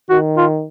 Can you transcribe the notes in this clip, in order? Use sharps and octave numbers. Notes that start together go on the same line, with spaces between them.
D#3 F#4
F4